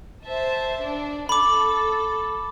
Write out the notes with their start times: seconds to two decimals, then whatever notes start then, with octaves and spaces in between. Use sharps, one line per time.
0.24 C5 E5 A5
0.82 D4
1.29 A4 B5 D6